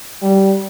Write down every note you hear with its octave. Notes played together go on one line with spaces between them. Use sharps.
G3